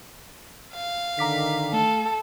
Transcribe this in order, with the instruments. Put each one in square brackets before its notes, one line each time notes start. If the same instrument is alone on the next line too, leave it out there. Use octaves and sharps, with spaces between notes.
[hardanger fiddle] F5
[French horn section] D3 D#3 [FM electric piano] A#5 D6 B6
[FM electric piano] A3 [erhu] A4